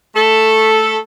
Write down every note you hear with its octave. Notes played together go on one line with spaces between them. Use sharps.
A3 A4